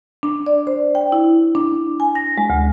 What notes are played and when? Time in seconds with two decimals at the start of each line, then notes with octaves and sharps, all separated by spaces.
0.23 D4
0.46 D5
0.67 C5
0.95 G5
1.12 E4
1.55 D4
2.00 G#5
2.15 A#6
2.38 G#3
2.50 D2